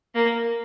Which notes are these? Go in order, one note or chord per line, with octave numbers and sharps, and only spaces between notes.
A#3